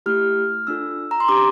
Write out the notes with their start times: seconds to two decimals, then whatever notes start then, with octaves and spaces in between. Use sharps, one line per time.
0.06 A3 E4 G4 F6
0.67 D4 F4 A4 E6
1.11 A#5
1.20 C6
1.29 D4 G4 D6